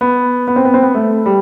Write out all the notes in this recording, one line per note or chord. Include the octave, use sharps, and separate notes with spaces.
B3
B3
C4
B3
C4
B3
A3
G3